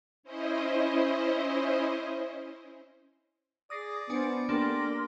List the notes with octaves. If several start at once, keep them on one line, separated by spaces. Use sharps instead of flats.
C#4 E4 C5 D#5
G#4 D5 D#6 A#6 C7
B3 D4 F4 C5 G#5 C#7
A#3 D4 G4 A4 A#4 C6